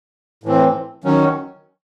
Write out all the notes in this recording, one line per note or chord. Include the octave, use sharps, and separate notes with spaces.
A2 E3 C4
D#3 F#3 C#4